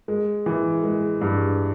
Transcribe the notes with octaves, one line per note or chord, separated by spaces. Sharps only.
G#3
E3
G#3
G2